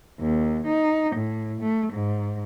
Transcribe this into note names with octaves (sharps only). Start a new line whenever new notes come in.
D#2
D#4
A2
A3
G#2